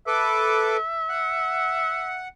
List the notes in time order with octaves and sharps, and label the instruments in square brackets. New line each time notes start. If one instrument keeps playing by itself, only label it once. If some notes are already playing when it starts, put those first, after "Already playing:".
[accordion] A4 B4 D6 [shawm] E5
[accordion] F#5